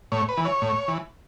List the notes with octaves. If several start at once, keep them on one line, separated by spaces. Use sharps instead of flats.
A2 C#5
B4
E3
C#5
A2
E3